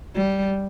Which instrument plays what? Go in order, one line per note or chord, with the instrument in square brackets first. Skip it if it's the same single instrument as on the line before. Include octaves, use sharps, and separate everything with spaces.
[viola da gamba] G3